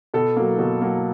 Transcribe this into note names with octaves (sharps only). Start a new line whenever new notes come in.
B2 A4
F#3 A#3
B2
F#3 A#3